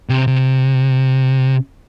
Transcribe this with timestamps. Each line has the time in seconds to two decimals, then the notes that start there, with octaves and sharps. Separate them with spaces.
0.09 C3
0.27 C3